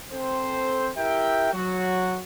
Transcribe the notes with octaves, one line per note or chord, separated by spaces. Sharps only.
C4 A4 C5
E4 G4 A#4 E5 G5
F#3 F#4